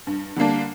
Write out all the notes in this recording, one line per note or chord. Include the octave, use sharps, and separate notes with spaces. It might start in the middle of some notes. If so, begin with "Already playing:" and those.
G2
D3 G3 A#3 D4